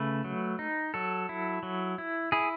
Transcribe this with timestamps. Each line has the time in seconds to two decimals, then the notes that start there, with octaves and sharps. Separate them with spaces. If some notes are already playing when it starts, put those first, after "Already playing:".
Already playing: C#3 A3 B4
0.24 F#3
0.59 D#4
0.94 F#3 A4
1.29 E4
1.63 F#3
1.98 E4
2.32 E4 G#4